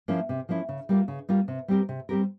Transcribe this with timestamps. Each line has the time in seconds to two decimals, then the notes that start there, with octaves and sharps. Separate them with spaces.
0.08 F3 A#3 C#4 E4
0.29 C3
0.49 F3 A#3 C#4 E4
0.69 C#3
0.89 G3 A#3 F4
1.08 C#3
1.29 G3 A#3 F4
1.48 C3
1.68 G3 C4 G4 A#4
1.89 C3
2.09 G3 C4 G4 A#4